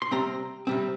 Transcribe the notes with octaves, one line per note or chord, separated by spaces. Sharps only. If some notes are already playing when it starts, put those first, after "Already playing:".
C6
C3 G3 C4 A#5
C3 G3 C4